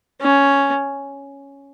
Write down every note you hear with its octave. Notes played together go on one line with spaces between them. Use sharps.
C#4